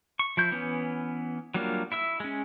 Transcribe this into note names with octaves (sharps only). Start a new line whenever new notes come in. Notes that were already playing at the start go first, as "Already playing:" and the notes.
C#6
F3 E4 G6
E3 B3 C#4
F#3 G3 A#3 D4 F4
E4 E5 E6
G#3 C#4